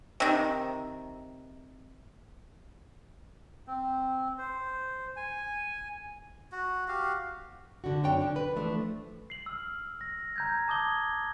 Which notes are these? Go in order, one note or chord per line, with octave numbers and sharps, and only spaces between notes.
C3 D#3
C4
C5
G#5
F#4
F#4 G4 F5
D3 D4 F#4
F#2 C4 D4 C#5 G5
D3 D4
B4
E3 F3 A3 D4
C7 F#7
E6 F6
A#6
A#5 G6 G#6
A5 D6 D#6 G#6 G7